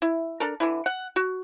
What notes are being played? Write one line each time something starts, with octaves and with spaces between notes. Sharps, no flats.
E4
D4 A4 A#4
D3 E3 E4
F#5
F#4